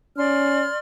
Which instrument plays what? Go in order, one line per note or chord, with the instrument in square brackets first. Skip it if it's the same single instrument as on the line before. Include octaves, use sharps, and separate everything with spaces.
[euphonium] C#4 [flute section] D5 C6 F6